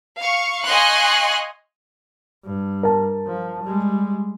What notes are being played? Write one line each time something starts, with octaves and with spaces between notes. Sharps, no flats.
F5 C#6
D#5 F5 G#5 C6 C#6 F#6
G2
A#4 A5
F3
G3 G#3